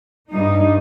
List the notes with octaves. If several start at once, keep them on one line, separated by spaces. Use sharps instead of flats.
G2 G3 D#4